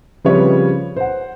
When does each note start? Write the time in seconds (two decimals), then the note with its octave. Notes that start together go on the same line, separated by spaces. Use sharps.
0.25 C#3 F3 G3 C4 B4 C#5
0.97 C5 F#5